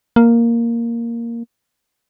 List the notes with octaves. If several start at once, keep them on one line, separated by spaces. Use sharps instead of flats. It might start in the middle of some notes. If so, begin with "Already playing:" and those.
A#3